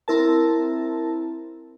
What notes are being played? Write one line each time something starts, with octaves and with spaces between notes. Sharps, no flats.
C4 E4 A#4 A5